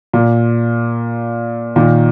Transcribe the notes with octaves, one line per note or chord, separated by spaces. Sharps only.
A#2
A#2 D#3